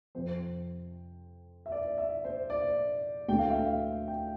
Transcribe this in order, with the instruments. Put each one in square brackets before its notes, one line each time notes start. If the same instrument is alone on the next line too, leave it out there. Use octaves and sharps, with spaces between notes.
[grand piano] F2 C3 F3 C4 C5
E5
D5
E5
C5
D5
D2 D3 A3 C4 G5
F5
E5
F5
G5